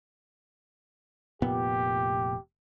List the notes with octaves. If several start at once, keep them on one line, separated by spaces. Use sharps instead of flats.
F1 A#2 B3 G4